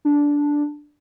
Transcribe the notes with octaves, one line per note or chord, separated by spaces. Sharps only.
D4